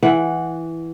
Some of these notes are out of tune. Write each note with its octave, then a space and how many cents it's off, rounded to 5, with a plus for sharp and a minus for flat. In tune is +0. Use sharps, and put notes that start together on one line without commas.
E3 +0 F#5 +0